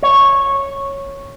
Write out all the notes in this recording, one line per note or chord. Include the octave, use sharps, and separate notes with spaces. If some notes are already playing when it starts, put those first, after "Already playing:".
C#5